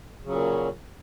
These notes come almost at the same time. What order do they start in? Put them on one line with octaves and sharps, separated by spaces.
C#3 F#3 A#2